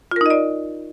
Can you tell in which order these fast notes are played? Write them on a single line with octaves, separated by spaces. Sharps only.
F4 A#4 D#4 D#5 D5